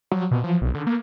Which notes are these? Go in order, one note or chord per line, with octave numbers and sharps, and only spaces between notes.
F#3
B2
F3
B1
D3
A#3